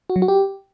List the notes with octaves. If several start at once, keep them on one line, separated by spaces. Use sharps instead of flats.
F#4
F#3
F#4
G4